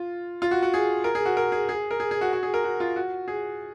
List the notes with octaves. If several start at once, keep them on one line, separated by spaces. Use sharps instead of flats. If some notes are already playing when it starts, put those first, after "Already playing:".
Already playing: F4
F4
F#4
F#4
G#4
A#4
G#4
F#4
A#4
G#4
G#4
A#4
G#4
G#4
F#4
F#4
G#4
A#4
F#4
F4
F#4
G#4